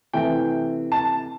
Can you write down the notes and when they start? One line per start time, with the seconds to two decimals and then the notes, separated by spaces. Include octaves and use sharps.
0.13 C3 E3 A3 G5
0.92 A5